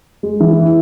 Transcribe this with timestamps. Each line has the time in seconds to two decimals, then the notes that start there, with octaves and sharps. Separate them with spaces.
0.23 G#3
0.40 E3